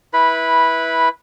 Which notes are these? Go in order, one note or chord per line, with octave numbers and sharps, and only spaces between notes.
E4 B4 B5